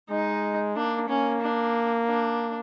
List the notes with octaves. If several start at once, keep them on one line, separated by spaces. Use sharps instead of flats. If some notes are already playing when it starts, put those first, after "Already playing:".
G#3 D#4
A#3 D4
A#3 C#4
D4
D4